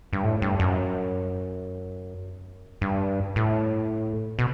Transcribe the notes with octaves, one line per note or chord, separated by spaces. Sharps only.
G2
A2
G2
F#2
G2
A2
B2